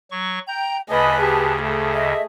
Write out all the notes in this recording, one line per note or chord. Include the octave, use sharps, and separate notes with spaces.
F#3 C#6
G5 A#5 G6
D2 C#3 B4 D#5 G#5 A5 B5
G4 G#4
A3 G#4
D#5 E5